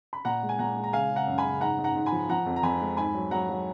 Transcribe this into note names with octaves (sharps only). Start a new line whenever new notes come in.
B5
A#2 F#5 A#5
G#3
G#5
A#2 F#5 A#5
G#3
A#5
C#3 F5 G#5
C#3
F#5 A#5
F#2
G#5 B5
C#3
G#2 F#5 A#5
G#2
F#5 A#5
G#2
G#5 B5
F3
F3 F#5 A#5
F2
A#5
F2 G#5 B5
G#3
G#2 G#5 B5
F#3
F#3 F#5 A#5
F#3